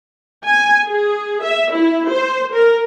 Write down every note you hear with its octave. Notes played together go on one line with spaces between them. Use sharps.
G#5
G#4
E5
E4
C5
A#4